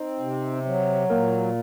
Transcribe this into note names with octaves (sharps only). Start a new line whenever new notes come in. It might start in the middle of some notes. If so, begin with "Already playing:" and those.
Already playing: C4 D#4 D#5
C3
F#3
A#2 A#3 A#4